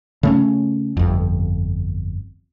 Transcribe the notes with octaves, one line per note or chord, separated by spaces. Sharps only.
C#3 A3 C#4
G1 F2